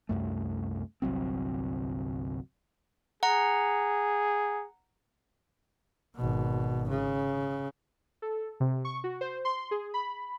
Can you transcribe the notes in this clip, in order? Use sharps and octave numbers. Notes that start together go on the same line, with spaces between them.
C2 F#2 A3
G1 C2 F#3 C4
G#4 F#5 A#5
G#1 B2
C#3
A4
C3
C#6
F#4
C5
C6
G#4
B5